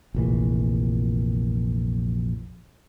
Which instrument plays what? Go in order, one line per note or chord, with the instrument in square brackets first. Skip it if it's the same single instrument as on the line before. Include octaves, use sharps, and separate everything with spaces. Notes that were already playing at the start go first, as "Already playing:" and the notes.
[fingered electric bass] F1 A#1 E3